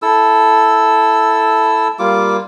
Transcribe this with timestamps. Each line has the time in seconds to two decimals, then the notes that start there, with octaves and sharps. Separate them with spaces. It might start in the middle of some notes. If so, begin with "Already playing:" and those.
0.02 E4 A4 E6
1.99 G3 A#3 F4 D6